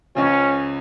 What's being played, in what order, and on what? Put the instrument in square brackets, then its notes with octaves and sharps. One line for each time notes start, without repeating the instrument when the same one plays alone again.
[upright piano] C#2 C#3 F3 [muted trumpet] C#4